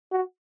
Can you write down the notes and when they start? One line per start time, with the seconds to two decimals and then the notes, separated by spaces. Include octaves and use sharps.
0.12 F#4